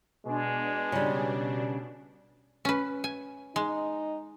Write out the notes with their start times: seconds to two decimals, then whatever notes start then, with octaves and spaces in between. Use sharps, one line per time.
0.25 B2 G#3 D4
0.92 C#3 G3
2.65 C#4 B4
3.04 G#5
3.56 G#3 D#4